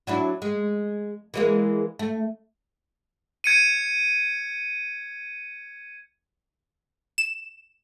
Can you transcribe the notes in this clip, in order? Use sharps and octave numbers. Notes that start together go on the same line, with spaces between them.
F#3 D4 E4
G#3
E3 G#3 A#3
A3
G#6 C#7 D#7
E7